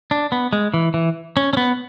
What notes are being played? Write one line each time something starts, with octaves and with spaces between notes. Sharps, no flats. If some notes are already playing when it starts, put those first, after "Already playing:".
D4
B3
G#3
E3
E3
C#4
C#4
B3